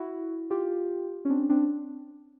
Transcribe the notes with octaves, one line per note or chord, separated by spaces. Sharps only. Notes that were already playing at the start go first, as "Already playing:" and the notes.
Already playing: E4 F#4
F4 G4
C#4
C4 D4
C4 D4